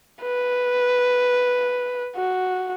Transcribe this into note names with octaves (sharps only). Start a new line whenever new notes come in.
B4
F#4